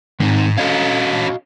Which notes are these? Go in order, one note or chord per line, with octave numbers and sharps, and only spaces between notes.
G#2 D#3 C4 D#4
C#4 F#4 A4 D#5 F5